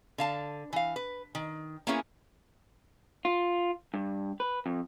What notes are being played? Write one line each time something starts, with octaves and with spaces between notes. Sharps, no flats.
D3 F5 A5
E3 F5
B4
D#3
A#3 B3 C#4 E4 G#4 C#5
F4
G2
B4
F2